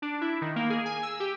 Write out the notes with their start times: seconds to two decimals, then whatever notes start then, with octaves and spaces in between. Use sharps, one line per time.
0.02 D4
0.21 E4
0.42 D#3
0.56 A#3
0.70 G#4
0.85 G#5
1.03 E6
1.20 G4